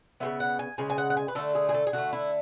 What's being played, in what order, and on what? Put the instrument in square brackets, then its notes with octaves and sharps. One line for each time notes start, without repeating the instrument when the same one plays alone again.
[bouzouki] C#3 G#3 B3 E5
F#5
G#5
C#3 G#3 G#5
G#5
F#5
F#5
G#5
B4
D3 A3 A4
G#4
G#4
A4
G#4
D3 A3 F#4
E4